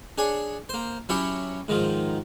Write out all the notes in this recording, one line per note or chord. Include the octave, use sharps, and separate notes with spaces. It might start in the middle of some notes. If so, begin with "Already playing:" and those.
D4 G#4 C#5 G#5
A#3 C5
F#3 C#4 E4 G4 C#5
G#2 D#3 F3